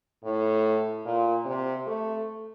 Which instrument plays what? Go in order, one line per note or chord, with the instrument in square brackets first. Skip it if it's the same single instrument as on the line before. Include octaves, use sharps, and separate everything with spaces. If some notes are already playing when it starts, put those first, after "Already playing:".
[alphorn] A2
A#2
C3
A3